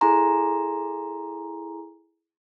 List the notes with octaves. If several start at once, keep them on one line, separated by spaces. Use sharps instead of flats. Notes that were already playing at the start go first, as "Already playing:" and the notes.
E4 G#4 A4 G#5 A#5 C6